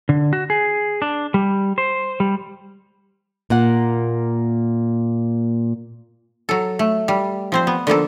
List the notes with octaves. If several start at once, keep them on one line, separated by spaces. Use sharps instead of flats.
D3
F#4
G#4
D4
G3
C5
G3
A#2 A#3 F#5
F#3 A4
A3
G3
F3 C4 C5
B3
D3 F3 A#3 A4